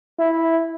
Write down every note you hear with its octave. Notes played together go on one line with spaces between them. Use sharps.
E4